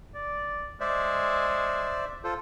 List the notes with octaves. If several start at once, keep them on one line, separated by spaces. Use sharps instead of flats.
D5
G#3 C5 D5 E5
F4 A4 C5